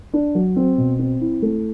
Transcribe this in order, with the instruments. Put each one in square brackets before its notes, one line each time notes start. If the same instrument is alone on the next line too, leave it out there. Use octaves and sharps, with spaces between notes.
[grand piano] D4
F#3
C4
B2
C4
E4
A3